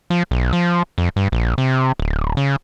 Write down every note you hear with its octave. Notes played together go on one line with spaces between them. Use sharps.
F3
B1
F3
F2
G2
A#1
C3
D1
C#3